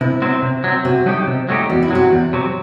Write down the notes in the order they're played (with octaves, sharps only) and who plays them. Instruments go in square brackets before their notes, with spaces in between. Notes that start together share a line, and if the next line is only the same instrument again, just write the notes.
[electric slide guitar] C3 [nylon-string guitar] E4
[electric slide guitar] F#3 C4
C3
F#3 C4
[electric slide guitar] C3 [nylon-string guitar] F#4
[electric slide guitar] F#3 A3 D#4 G4
C3
F#3 A3 D#4 G4
[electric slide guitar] E2 [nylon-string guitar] F#4
[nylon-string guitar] E4
[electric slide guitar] C3 F#3 [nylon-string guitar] F#4
[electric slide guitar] E2
C3 F#3